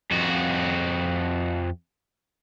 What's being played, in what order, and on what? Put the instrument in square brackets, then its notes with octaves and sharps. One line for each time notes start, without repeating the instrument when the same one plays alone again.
[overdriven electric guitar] F2 F#4